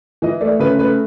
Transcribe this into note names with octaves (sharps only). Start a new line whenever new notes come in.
E3 D#5
A3 D5
C#3 B4
A3 B4